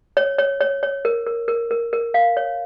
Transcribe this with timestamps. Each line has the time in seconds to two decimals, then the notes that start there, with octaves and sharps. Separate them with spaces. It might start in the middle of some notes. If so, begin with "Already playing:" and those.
0.17 C#5
0.38 C#5
0.61 C#5
0.83 C#5
1.05 A#4
1.27 A#4
1.48 A#4
1.71 A#4
1.93 A#4
2.14 F5
2.37 C#5